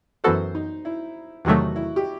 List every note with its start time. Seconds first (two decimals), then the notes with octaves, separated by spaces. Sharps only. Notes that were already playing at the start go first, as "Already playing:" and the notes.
0.24 F#2 E3 B3 F#4 A4 C5
0.55 D#4
0.85 E4
1.45 E2 C3 D#3 F#3 A3 F#4
1.76 E4
1.96 G4